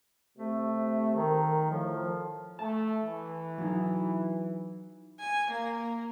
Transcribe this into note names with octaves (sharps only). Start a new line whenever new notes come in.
C3 A3
D#3 A#4
A2 F3
A3 A5
E3
F#3 D#4
G#5
A#3